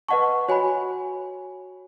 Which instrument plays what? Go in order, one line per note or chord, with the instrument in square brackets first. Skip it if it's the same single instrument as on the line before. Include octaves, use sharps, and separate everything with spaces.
[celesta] B4 D#5 F#5 A5 C#6
F#4 C#5 G#5 B5